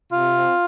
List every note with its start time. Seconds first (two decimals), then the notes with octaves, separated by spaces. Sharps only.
0.12 C3 F4
0.34 C4